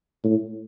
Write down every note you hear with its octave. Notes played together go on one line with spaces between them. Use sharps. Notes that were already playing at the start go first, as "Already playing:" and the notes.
A2